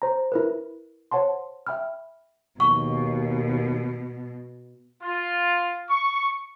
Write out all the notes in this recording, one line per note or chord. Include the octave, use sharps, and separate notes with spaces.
C5 A#5
E4 A#4 B4
C5 C#5 F#5 A5 C6
E5 G5 B5 F6
D#2 B2 C#6
F4
C#6